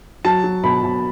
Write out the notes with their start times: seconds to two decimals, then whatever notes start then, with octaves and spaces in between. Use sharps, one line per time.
0.25 F#3 A5
0.44 F#3
0.64 B2 B5
0.83 B2